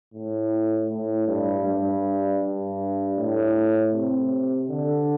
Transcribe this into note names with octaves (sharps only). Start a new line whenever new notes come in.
A2
A2
G2
G2
G2
A2
C3
D3